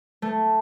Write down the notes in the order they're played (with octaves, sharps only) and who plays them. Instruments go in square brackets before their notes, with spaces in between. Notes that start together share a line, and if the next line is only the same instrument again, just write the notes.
[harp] A3